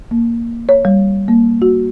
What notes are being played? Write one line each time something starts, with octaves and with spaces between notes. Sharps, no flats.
A#3
C#5
G3
A#3
F#4